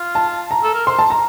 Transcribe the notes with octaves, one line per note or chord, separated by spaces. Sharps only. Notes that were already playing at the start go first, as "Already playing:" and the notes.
Already playing: F4
A5
A#5
A4
A#4
C5 C6
A5
A#5